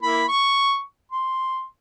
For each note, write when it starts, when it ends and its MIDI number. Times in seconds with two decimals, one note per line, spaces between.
0.02 0.24 58
0.02 0.24 64
0.02 0.24 83
0.28 0.80 85
1.11 1.63 84